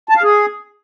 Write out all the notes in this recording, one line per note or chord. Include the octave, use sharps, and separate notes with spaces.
A5
F5
G#4